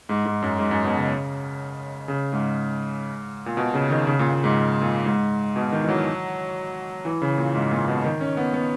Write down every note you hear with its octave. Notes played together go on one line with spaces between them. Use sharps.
G#2
G#2
F#2
G#2
F#2
B2
C#3
C#3
G#2
A#2
B2
C#3
D#3
C#3
A#2
A#2
G#2
A#2
G#2
B2
D#3
E3
F#3
E3
C#3
A#2
G#2
A#2
B2
D#3
C#4
B3
B3